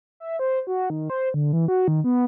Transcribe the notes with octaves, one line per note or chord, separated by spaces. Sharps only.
E5
C5
F#4
D#3
C5
D3
E3
F#4
D#3
B3